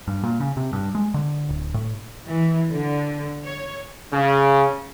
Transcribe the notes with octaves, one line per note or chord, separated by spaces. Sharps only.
G2
A#2
C#3
C3
G2
G#3
D3
D1
A2
E3
D3
C#5
C#3